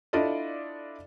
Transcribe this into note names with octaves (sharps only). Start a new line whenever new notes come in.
D4 E4 F4 A4 D5 D#5